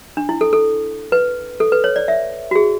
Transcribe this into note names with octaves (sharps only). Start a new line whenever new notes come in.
D4
E4
A4
A4
B4
A4
B4
C#5
D5
E5
F#4
G#4